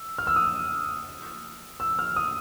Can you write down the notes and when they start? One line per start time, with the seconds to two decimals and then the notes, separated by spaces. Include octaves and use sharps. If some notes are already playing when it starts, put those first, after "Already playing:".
Already playing: E6
0.18 F6
0.27 E6
0.36 D#6
1.80 E6
1.99 F6
2.16 D#6